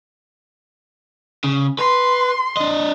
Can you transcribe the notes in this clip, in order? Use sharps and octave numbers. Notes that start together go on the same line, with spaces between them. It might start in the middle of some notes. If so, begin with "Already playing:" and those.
C#3
B4 C6
D4 D#5